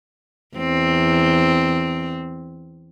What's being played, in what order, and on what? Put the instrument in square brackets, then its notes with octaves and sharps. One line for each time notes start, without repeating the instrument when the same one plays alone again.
[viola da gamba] E2 C4